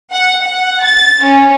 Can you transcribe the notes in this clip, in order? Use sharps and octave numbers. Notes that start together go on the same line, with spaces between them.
F#5
F#5
A6
C#4